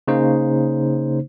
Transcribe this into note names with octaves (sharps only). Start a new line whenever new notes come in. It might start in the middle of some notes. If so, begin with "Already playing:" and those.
C#3 A#3 D#4 C5